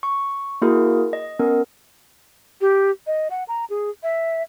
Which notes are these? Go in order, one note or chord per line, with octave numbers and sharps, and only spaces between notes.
C#6
A#3 E4 F#4 G#4 A#4
D#5
B3 C#4 A#4
G4
D#5
F#5
A#5
G#4
E5